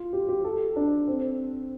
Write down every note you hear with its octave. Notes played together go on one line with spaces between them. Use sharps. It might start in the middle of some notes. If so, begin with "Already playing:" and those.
Already playing: F4
G4
G4
A4
D4
C4